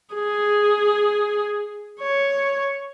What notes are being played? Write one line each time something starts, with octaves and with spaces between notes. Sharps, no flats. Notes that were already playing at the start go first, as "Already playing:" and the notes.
G#4
C#5